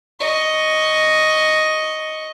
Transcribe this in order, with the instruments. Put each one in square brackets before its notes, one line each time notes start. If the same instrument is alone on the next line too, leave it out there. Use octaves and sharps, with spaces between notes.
[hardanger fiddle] D#5 C#6